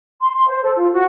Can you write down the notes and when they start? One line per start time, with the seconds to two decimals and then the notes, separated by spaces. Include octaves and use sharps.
0.21 C6
0.35 C6
0.48 C5
0.63 A4
0.76 F4
0.93 F#4